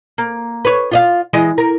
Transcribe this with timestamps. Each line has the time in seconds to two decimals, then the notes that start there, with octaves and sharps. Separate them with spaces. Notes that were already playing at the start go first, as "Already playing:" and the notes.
0.18 A#3
0.65 B4 C#5
0.91 F4 D#5 F5
1.33 E3 G#3 D#5
1.58 A#4